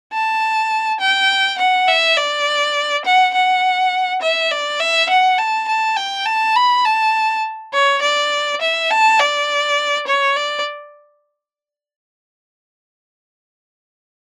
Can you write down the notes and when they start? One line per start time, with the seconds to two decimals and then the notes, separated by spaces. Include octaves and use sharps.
0.13 A5
1.00 G5
1.59 F#5
1.88 E5
2.17 D5
3.05 F#5
3.34 F#5
4.22 E5
4.51 D5
4.80 E5
5.10 F#5
5.38 A5
5.68 A5
5.97 G5
6.26 A5
6.56 B5
6.85 A5
7.73 C#5
8.02 D5
8.61 E5
8.90 A5
9.19 D5
10.07 C#5
10.36 D5